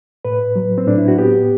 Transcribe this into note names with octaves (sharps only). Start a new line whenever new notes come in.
A2 B4
F#3
C4
A2 D4
E4
F#4
B3 G4